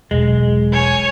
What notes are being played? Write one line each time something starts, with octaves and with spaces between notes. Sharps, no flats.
E1 B1 G#3
C#5 G#5